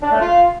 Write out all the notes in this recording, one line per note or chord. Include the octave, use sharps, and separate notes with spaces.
D4
A3
F4